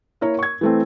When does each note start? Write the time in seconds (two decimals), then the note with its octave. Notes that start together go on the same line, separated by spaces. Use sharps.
0.21 A#3 E4 A#4 C#5
0.39 C#6 G#6
0.61 E3 A3 C4